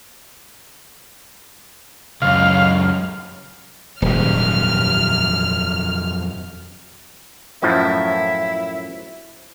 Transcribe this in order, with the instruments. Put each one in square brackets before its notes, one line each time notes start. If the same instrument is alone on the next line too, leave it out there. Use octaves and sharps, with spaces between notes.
[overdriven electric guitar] C#2 F#2 [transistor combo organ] F5
[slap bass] D#1 G#2 [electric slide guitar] F2 F#3 G4 [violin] F6
[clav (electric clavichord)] F#2 A2 F3 [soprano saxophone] E4